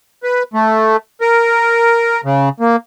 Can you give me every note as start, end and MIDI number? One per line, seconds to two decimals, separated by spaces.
0.23 0.43 71
0.54 0.97 57
1.21 2.21 70
2.25 2.49 49
2.60 2.76 58